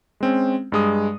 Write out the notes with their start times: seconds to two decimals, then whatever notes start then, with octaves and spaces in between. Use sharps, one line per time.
0.21 G#3 C4 C#4
0.72 G2 G#3 D#6